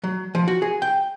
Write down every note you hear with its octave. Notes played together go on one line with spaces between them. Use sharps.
F#3
F3
F#4
G#4
G5